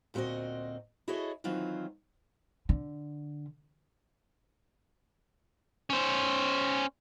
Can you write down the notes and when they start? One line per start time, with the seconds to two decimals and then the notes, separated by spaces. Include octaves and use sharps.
0.14 D2 A#2 G#3 C4 F#4 D#5
1.08 E4 F#4 G#4 A4 C#5 D#5
1.44 D#3 E3 F#3 C4 F4
2.69 D3
5.90 C#4 C5